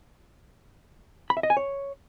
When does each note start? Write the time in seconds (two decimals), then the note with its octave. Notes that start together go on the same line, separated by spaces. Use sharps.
1.30 B5
1.37 E5
1.43 D#5
1.50 G#5
1.57 C#5